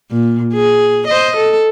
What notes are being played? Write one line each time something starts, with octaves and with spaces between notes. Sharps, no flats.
A#2
G#4
C5 D#5
A4